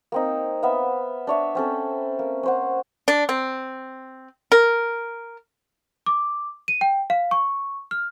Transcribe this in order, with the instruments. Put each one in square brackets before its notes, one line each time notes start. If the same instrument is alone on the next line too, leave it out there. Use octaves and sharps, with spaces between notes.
[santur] A#3 C4 D#4
B3 E5 F5
D4 C#5 E5
C4 C#4 A4
A#3
C#4 C5 F#5
[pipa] D4
C4
A#4
[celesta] D6
D#7
G5
F5
C#6
F6